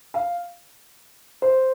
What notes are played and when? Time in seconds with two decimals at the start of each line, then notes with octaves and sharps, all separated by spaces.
0.14 F5
1.42 C5